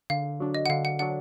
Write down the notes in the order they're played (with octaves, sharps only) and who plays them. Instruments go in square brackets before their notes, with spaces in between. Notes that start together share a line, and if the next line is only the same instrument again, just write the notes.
[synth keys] D3 [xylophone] F5
[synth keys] F#3 D4
[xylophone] D#5
F#5
[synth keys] D3 [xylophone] F5
[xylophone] F#5
[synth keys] F#3 D4 [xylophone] F#5